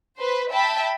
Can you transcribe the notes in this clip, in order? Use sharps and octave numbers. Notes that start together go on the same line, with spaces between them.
B4 C5
E5 G5 A5 B5